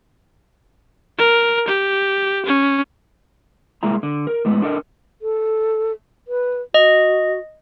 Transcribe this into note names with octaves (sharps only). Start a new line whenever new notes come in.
A#4
G4
C#4
C2 G#3 A#3 E4 A#5
D3
A#4
A2 G#3 B3
D4 A4 A#4 D#5
A4
B4
F#4 D#5